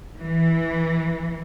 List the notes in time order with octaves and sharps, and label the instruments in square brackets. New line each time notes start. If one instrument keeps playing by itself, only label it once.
[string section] E3